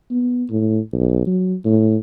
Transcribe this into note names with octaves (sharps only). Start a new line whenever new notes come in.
B3
A2
B1
F#3
A2